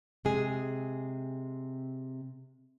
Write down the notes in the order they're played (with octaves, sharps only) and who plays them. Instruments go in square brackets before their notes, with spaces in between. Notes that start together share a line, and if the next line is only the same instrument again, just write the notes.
[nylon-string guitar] C3 G#3 G#4